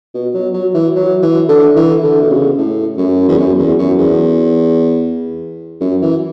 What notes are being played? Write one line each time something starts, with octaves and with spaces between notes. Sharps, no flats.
B2
F#3
F#3
E3
F#3
E3
D3
E3
D3
B2
C#3
A2
F#2
E2
F#2
E2
F#2
E2
F#2
E3